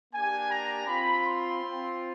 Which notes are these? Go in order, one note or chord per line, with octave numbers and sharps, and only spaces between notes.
A#3 D4 G4 G#5
A#5
C4 F4 B5
C6
C4 F4